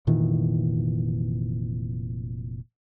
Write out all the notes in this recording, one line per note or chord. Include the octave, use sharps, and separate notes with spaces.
F1 A#2 D#3 E3